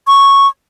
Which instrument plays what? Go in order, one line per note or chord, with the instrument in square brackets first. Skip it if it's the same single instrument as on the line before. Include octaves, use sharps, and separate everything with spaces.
[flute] C#6